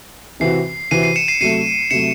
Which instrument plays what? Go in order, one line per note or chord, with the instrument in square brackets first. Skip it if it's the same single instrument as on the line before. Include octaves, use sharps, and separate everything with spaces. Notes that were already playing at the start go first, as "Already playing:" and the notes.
[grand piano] C3 E3 C4 F#4 [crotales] C7
[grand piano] C3 E3 C4 F#4 [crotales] C7 D#7
[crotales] C7 D#7
C#7 E7
C7 D#7
[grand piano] C3 F#3 A3 [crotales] C7 D#7
[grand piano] C3 F#3 A3 [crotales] C#7 E7